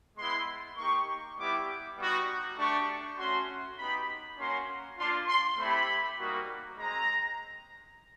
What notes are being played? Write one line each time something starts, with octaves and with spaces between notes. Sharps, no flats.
G#3 B3 E4 C6
A#3 D#4 G4 C#6
G3 B3 E4 G4 D6
G3 B3 D#4 F#4
A3 D4 G4 C#6
A3 C#4 F#4 C6
B3 D#4 G4 B5
A#3 C#4 F#4 C6
A#3 D4 F4 C6
C6
A3 C4 E4 G4 B5
G3 A#3 D#4 F#4
G#3 C4 A#5